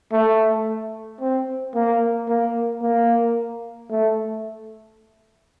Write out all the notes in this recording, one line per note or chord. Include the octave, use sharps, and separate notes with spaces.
A3
C4
A#3
A#3
A#3
A3